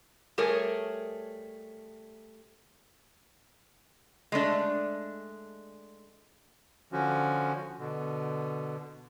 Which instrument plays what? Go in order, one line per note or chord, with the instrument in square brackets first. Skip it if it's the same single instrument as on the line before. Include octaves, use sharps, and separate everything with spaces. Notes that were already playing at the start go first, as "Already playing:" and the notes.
[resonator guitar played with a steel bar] G3 A3 G#4 A#4 C#5
G#3 A3 D4
[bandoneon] D3 F3 C#4 F#4
B2 D3